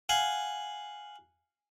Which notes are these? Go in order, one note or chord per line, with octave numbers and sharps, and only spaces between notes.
F5 F#5 G#5